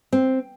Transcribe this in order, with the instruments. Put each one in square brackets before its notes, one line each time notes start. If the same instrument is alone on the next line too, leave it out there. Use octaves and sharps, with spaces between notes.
[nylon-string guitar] C4